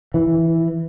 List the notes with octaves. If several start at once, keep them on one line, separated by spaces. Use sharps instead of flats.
E3